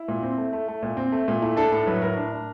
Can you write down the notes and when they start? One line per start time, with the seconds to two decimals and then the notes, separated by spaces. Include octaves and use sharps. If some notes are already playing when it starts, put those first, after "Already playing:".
Already playing: E4
0.08 A#2
0.22 C4
0.38 A3
0.53 A3
0.68 A3
0.83 A#2
0.97 C4
1.12 A3
1.28 A#2
1.42 A3 E4
1.57 D4 A4
1.72 A2 A4
1.87 F#3 B4
2.02 A2 A#4
2.16 D4
2.32 D4